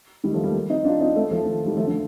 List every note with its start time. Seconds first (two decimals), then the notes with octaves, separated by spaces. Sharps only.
0.24 D#3 G3
0.33 F3 A3
0.44 G3 A#3
0.70 C4 D#4
0.85 D4 F4
1.00 C4 D#4
1.15 A3 C4
1.31 F3 A3
1.46 D#3
1.66 D#3 G3
1.77 F3 A3
1.87 D3 F3